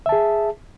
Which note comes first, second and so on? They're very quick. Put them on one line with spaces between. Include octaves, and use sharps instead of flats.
E5 A5 G#4